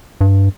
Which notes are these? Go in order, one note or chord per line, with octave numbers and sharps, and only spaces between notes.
G2